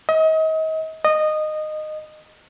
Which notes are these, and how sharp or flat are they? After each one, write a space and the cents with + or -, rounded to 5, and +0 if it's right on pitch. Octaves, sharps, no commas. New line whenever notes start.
D#5 +35
D#5 -15